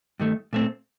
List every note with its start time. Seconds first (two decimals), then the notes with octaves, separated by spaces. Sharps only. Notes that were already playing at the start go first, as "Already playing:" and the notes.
0.20 G2 D#3 A3
0.53 A#2 A3 C4